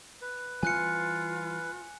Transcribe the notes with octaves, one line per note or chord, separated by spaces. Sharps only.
B4
E3 G3 C4 F4 G#5 F#6 C#7